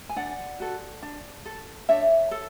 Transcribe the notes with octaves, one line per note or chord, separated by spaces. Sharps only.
G#5
D4 D5 F#5
F#4 A4
D4
A4
D4 C#5 E5
A4